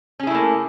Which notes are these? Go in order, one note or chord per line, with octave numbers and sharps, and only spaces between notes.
A3 A#3 C#4 E4 G#4